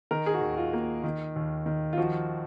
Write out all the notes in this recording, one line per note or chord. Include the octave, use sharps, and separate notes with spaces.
D#3 A#4
G#4
F#4
D#2
F4
A#3
D#3
D#2
D#3
F4
F3 F#4